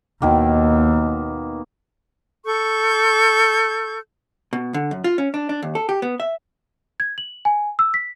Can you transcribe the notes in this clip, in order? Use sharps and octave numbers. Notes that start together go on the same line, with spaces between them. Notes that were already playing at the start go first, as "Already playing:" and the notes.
D#2 B2 D#3 A#3
A4 C#6 G6
B2
D3
F#2
F4
C#4
D4
D4
D#2
A4
G4
B3
E5
G#6
F#7
G#5
E6
B6